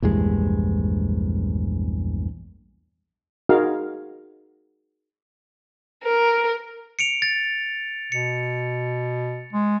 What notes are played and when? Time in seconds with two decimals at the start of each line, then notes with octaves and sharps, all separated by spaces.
0.02 A#1 E2 G2 G#3
3.49 D#4 F#4 G#4 A#4 F5
6.04 A#4
6.99 C#7 D7 F7
7.22 A6
8.12 B2 C#7
9.53 G#3